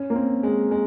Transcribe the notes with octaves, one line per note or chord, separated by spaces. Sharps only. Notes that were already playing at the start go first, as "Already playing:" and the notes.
Already playing: C#4
A#3
C4
G#3
G#3